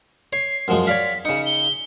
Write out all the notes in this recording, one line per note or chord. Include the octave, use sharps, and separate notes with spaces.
C#5 C7
F#2 F3 G#3
C#5 D5 F5 B6
C#3 D#4 C#7
G7